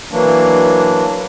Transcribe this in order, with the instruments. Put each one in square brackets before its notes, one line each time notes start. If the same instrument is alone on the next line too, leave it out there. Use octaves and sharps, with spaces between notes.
[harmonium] E3 F#3 A#3 D4